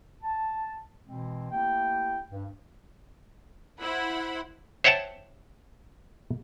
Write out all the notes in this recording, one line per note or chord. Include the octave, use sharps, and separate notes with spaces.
A5
B2 E3 G#3 C4
A3 A#3 E4 G4 G5
G2
E4 C5 F#5 B5
C5 C#5 E5 F#5 G5 A5